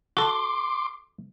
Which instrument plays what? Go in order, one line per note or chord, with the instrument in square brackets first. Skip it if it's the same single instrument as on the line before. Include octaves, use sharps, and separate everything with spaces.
[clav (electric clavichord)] F#4 A4 [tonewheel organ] C6 D6